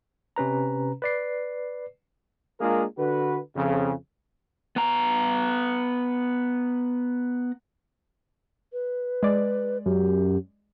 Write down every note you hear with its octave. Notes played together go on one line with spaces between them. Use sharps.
C3 C#4 B4 A#5
B4 D5 C7
G#3 A#3 D4 F4 G#4 A#4
D3 F#4 B4
F2 C#3
B3 A#5
B4
G#3 D5
F#2 G4